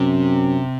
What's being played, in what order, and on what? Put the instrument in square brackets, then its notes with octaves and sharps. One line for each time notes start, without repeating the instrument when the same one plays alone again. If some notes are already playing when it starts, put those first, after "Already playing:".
Already playing: [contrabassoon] F#2 [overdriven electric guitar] C3